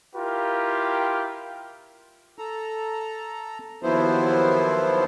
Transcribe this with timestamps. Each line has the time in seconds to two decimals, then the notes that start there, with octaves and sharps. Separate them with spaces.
0.16 E4 F4 G4 A#4
2.39 A4 A#5
3.83 D#2 F3 F#3 B3 E4 C5